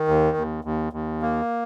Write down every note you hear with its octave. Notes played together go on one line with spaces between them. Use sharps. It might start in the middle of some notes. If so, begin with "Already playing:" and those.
Already playing: D#3
D#2
D#2
D#2
D#2
A#3